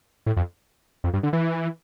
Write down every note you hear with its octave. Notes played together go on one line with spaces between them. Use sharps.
A2
F2
F2
G2
D3
E3